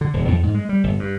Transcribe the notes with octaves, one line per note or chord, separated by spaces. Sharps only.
D3
D#1
E2
G#2
G#3
G3
G1
G2